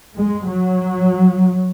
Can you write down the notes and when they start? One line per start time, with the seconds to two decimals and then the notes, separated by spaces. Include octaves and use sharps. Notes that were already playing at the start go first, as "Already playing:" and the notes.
0.18 G#3
0.48 F#3